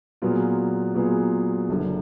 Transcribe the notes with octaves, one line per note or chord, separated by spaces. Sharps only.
A#2 F#3 B3 F4 G#4
A#2 F#3 B3 F4 G#4
F#1 F#2 D3 F#3